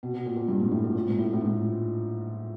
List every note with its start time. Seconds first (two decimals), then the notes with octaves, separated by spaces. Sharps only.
0.03 B2
0.14 B2
0.26 A#2
0.37 A#2
0.48 G2
0.60 G#2
0.71 A2
0.84 A#2
0.95 A#2
1.07 G#2
1.18 A2
1.33 A2
1.41 G#2